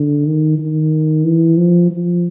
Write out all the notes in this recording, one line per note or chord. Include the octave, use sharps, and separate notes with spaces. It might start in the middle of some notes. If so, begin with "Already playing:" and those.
Already playing: D3
D#3
D#3
E3
F3
F3